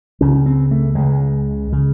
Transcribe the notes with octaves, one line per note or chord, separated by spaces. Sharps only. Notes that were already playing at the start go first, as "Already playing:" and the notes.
C#2 C#3 C#4
C4
A3
C#2 C#3 G#3
C#3